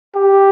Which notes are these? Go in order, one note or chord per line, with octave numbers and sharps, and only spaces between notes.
G4